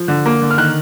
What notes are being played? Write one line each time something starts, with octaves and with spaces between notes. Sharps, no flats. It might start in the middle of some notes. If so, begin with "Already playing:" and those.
Already playing: F3
D3
A#3
D3
F6
D#3 F#6